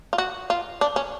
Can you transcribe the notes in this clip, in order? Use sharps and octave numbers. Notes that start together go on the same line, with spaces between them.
F4
F#4
F4
D4
C#4